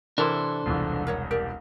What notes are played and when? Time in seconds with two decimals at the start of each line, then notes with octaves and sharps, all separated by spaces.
0.18 C3 E3 D4 E4 A4 A#4 C5
0.66 E1 C2 E3 F4
1.07 A#4 C#5 F#5
1.31 G4 A#4 D5